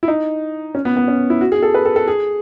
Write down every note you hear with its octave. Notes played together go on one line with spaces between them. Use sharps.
E4
D#4
C#4
B3
B3
C#4
E4
F#4
G#4
A4
B4
A4
A4
G#4